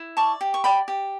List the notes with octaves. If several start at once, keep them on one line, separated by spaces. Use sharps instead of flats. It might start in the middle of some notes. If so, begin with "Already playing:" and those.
Already playing: E4
D5 A5 C#6
G4
C#6
D5 G5 B5
G4